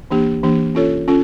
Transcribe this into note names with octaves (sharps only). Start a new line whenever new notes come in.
E3 A#3 D4 G4
E3 A#3 D4 G4
C#4 F4 A4 C#5
C#4 F4 A4